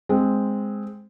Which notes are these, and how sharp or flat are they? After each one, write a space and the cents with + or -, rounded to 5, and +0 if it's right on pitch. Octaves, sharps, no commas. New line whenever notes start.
G#3 +0 C4 +0